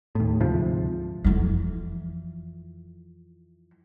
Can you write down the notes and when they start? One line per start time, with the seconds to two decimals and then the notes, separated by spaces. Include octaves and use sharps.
0.15 D#2 A2
0.40 D2 G#2 C3 F3
1.24 F2 E3